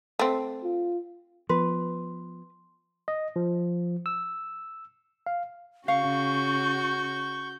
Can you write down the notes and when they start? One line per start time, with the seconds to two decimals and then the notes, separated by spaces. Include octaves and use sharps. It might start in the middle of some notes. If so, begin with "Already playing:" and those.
0.19 A3 C4
0.63 F4
1.49 F3 B3 B4 C6
3.08 D#5
3.36 F3
4.06 E6
5.26 F5
5.88 C#3 F#4 F5 C#6 G6